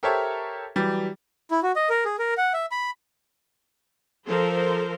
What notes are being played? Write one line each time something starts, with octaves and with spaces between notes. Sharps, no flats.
G4 A4 A#4 C5 C#5 E5
E3 F#3 G3
E4
F#4
D#5
A#4
G#4
A#4
F#5
E5
B5
F3 A4 A#4 C5